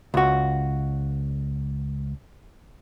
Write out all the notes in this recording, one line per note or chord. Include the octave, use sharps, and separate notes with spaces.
C#2 F#4